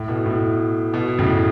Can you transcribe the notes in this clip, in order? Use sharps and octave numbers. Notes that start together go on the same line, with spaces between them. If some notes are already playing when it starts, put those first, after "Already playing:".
Already playing: A2
B2
A2
B2
A2 C#3